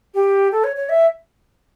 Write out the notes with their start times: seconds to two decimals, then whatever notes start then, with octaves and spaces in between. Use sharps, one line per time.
0.14 G4
0.52 A4
0.64 C#5
0.76 C#5
0.89 E5